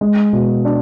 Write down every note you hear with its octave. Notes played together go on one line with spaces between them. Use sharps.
G#3
B2
D4